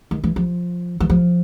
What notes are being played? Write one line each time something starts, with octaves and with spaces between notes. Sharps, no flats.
D#3
E3
F3
E3
F3